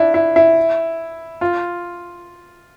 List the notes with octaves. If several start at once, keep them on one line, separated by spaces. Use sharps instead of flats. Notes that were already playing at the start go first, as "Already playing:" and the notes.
Already playing: D4 E4
E4
E4
F4